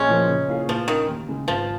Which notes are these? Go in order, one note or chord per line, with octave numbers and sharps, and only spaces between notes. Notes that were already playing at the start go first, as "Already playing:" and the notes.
Already playing: A#1 G#3 C#4
A#2 F3 A#3
C#3
A#3 F4 G#4
A#2 F3
D#3 A#3 C#4
D#2
C#3 G#3
G#1 F3